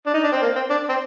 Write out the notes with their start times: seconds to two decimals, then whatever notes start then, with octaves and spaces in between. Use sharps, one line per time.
0.07 D4
0.14 D#4
0.24 D4
0.32 C4
0.42 A#3
0.56 C4
0.70 D4
0.89 C4